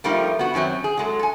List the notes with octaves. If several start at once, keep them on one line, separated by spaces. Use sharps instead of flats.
F3 G3 A3 A#3 D#4 F4
B3 F#4
F#2 D#3 F#3 C4
G#4
F#3 G#3 A4
A4 G#5